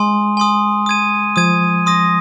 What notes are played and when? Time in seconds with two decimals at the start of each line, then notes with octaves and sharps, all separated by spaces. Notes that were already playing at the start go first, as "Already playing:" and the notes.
Already playing: G#3 G#5 C6 D#6
0.37 G#5 C6 D#6
0.86 D#6 G#6 D#7
1.36 F3 D#6 G#6 D#7
1.86 C6 D#6 A#6